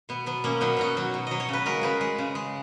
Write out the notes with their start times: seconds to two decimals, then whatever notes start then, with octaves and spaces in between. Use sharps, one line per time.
0.09 B2 B3
0.26 F#3 B3
0.44 B2 A#3 C#4
0.61 F#3 B3 D#4
0.77 B2 D#4 F#4
0.97 F#3
1.14 B2
1.27 F#3 D#5
1.40 C#5
1.49 C#3 B4
1.66 G#3 F#4 A#4
1.81 C#3 G#4 B4
2.01 G#3
2.18 C#3
2.35 G#3